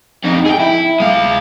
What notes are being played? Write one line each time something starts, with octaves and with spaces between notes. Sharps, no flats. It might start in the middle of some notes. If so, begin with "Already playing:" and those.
F2 D#4
G#4 G5
E4
G#3 F5